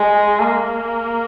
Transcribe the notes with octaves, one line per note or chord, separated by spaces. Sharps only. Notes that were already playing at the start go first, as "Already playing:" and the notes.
Already playing: G#3
A#3